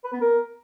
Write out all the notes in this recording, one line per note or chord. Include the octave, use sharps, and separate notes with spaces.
B4
B3
A#4